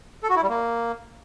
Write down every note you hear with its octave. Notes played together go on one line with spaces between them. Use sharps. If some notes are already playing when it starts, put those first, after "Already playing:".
A4
F#4
E4
G3
A#3